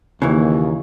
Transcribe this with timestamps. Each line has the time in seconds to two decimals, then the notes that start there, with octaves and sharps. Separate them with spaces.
0.22 D#2 C#3 E3